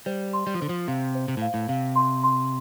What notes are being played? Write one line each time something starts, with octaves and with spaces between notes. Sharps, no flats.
G3 C5
C6
G3
F3
D3 C5
F3
C3 F5
C5
C3
A2
F5
A2
C3 F5
C6
C6